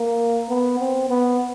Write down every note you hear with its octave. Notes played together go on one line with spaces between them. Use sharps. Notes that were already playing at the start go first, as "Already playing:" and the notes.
Already playing: A#3
B3
C4
B3